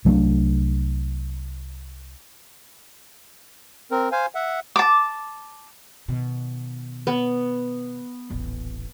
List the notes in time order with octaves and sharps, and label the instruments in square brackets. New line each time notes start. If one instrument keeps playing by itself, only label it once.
[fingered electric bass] C2 F#3 A3 D4
[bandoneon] C4 A#4
C5 F5 G#5
E5 F#5
[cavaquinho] A5 D6
[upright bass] B2 D#3
[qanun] B3
[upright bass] D#1 A1